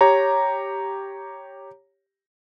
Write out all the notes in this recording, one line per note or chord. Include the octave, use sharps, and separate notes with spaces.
G4 C#5 A#5